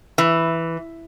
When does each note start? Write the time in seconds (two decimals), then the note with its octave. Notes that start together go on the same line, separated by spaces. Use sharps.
0.18 E3